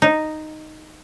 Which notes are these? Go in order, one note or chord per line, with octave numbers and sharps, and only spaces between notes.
D#4